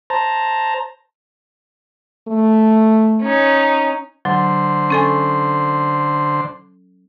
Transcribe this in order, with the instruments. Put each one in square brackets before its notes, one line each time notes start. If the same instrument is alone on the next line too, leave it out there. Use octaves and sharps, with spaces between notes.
[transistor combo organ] C5 A5 A#5
[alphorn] A3
[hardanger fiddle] C#4 D#4
[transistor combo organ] D3 C5 [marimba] F#3
[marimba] C#4 A4 G#5